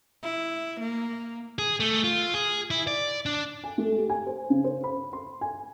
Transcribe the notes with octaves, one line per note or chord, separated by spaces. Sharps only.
E4
A#3
G#4
A3
F4
G#4
E4
D5
D4
G#5
A3
G4
G#5
C5
C#3
C5
B5
C6
G#5